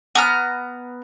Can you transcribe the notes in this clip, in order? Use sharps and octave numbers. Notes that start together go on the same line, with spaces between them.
B3 A#5 F6